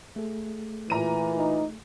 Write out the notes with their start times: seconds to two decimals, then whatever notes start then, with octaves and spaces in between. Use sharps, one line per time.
0.16 A3 G#4 A4
0.90 A#2 E3 A#5 D#7
1.37 D#4